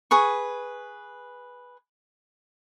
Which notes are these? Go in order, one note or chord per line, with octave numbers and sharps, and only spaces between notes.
G#4 B4 C#6